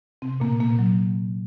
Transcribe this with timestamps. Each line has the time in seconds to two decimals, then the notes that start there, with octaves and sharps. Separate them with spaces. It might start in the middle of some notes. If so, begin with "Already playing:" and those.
0.22 C3 C4
0.40 A#2 A#3
0.60 A#2 A#3
0.79 F#3